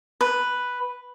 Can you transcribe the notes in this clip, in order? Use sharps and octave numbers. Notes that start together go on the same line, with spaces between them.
B4